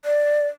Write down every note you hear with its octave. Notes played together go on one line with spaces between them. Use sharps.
D5